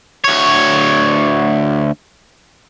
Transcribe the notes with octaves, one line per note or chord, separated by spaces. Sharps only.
D2 C#5